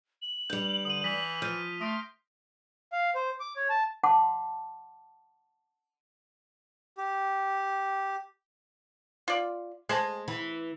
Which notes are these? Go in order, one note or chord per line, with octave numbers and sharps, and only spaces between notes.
F#7
G2 G3 G6 F7
D3 D#6 D#7
E3 D#6 B6
F3 F6 G6 D#7
A3 C6 D#6 A#6 D7
F5
C5
D6
C#5
A5
F#5 A5 C6 D6
G4
F4 D5
G#3 G#4 C5 A5
E3